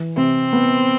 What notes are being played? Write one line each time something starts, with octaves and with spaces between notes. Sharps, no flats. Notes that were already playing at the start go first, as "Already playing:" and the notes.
Already playing: E3
C3 C4
B3